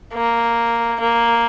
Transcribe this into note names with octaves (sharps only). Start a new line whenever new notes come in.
A#3
A#3